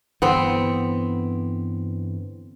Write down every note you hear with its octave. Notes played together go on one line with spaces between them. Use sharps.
G2 D3 E3 B3 C4